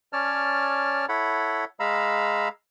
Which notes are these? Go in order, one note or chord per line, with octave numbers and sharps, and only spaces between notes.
C#4 C#5 D5 A5 F6
E4 A4 C#5 F#5 B5
G#3 F5 A#5 B5 E6